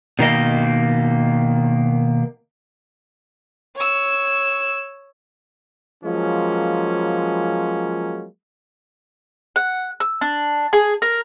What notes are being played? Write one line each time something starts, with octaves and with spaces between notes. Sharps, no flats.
B2 D#3 A#3 D#5
C#5 E6
F3 F#3 G#3 A#3 C#4
F#5
E6
D4
G#4
A#4